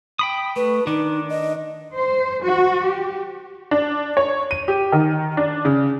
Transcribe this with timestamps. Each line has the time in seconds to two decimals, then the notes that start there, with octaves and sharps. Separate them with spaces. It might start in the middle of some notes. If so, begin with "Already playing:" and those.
0.19 G5 B5 D#6
0.56 A3 B4
0.87 D#3 D4 D#4
1.29 D#5
1.94 C5
2.44 F#4
2.87 G4
3.71 D4
4.17 C#5
4.51 D#7
4.68 G4
4.92 D#3
5.37 D4
5.65 C#3